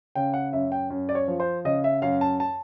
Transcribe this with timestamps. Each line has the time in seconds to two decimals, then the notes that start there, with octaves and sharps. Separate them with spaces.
0.15 C#3 G5
0.34 F#5
0.53 F#2 E5
0.72 G5
0.90 F#2
1.09 D5
1.15 C#5
1.28 F3
1.40 C5
1.65 C#3 D#5
1.84 E5
2.02 F#2 F5
2.21 A5
2.40 A5